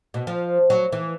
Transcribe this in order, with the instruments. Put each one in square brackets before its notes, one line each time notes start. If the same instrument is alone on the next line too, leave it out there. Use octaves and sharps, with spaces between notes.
[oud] B2
F3
F#3
E3